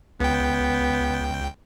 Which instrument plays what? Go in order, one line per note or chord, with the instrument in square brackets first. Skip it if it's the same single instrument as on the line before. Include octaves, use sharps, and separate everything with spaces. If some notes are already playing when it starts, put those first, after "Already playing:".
[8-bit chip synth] C#2 G5 [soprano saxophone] B3